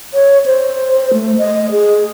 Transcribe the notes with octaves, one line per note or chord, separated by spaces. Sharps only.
C#5
C5
A3
D#5
G#4